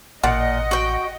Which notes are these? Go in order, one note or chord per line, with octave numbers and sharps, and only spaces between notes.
A1 A#2 D#5 F#5
F#4 G5